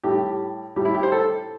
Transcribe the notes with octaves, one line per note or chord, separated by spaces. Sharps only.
A2 G3 G4
A2 G3 G4
E4
G4
C5
A4